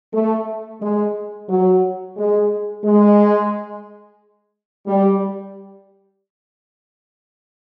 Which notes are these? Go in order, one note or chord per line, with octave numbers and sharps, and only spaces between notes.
A3
G#3
F#3
G#3
G#3
G3